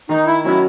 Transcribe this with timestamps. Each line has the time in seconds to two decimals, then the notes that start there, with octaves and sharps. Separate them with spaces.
0.09 D#3 D#4
0.26 E4
0.44 F#3 C#4 E4 F#4